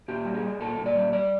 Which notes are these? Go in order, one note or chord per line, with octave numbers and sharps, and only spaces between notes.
A#2 G4
G3
G#4
G3
A#2 A4
A#2
D5
G3
G3 D5